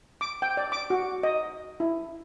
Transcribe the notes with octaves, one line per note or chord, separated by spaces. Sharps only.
D6
G5
D5
D6
F#4
D#5
E4